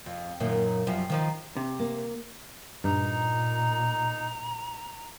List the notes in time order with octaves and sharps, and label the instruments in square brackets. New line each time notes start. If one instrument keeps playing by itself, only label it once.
[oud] F2
F#2 A#2 D#3
F#2 F3 G3
D#3 F3 D#4
[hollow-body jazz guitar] C3
[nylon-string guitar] A#3
[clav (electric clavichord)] G2 [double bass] A#2 [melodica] D#4 [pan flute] A#5